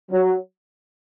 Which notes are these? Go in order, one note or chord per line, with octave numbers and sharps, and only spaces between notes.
F#3